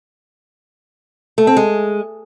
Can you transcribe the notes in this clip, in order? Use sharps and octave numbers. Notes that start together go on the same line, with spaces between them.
A3
C4
G#3